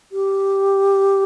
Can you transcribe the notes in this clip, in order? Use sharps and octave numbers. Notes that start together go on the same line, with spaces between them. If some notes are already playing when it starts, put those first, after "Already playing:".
G4